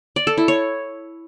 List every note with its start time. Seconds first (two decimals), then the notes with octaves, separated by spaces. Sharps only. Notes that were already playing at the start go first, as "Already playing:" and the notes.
0.16 D5
0.27 A4
0.38 E4
0.48 C#5